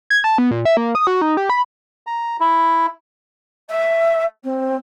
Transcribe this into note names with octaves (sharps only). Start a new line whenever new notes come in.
G#6
A5
B3
A#2
E5
A#3
D#6
F#4
D#4
G4
B5
A#5
E4
E5
C4